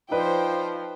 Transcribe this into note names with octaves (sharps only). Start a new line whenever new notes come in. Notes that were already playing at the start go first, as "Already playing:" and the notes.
F3 D#4 B4 C5 D5 G5